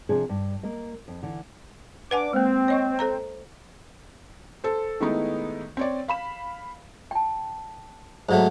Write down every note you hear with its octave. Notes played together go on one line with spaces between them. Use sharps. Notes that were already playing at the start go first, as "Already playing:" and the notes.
C3 F3 D4 G#4
G2
A#3 A#4 D#5
F2
D3 E3
D4 B4 F#5 G#5 D6
G#3 A#3 C4
C#5 D#5 C#6
A4 C5 A#5
A4 C5
D#3 G#3 A3 B3 D#4 E4
C4 C#5 D5
F5 B5 E7
G5 A5
G#2 F#3 A3 C5 C#5